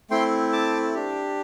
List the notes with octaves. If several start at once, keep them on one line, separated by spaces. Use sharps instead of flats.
A3 C4 E4 G5 C6
A5 D6
D4 G4